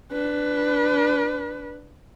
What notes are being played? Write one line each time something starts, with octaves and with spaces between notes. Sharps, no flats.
D4 B4